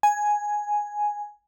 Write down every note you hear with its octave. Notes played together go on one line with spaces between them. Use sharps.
G#5